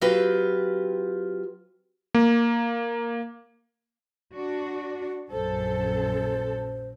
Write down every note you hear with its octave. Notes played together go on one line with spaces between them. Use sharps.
F#3 C4 F4 G4 B4
A#3
D4 F#4
A#1 F#2 A4 C5